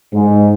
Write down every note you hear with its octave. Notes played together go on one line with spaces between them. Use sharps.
G#2